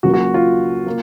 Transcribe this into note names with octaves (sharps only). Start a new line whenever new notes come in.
C#2 C#3 F#3 A#3 F#4
F#4
F4
A#3